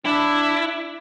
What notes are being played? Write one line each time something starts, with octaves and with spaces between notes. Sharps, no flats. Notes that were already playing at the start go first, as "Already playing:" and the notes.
D4 E4